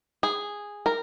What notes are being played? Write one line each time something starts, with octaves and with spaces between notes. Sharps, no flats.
G#4
A#4